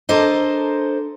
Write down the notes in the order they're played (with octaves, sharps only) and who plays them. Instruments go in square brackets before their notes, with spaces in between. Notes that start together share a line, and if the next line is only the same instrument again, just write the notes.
[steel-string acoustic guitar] D4 A4 A#4 C5 D#5